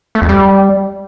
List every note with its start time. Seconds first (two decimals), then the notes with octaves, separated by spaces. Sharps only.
0.15 A3
0.22 F2
0.29 G3